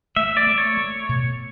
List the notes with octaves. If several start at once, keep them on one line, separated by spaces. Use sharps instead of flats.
A3 E5
D5
A3
C#5
A3
B2